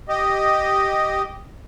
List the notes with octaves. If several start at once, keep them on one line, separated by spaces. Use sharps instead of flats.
G4 D#5